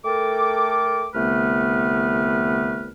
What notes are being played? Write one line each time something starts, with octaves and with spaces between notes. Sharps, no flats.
A3 A4 A#4 G5 D6
C2 D3 A3 B3 B4 F6